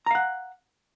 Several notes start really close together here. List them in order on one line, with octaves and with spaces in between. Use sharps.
A#5 F5 F#5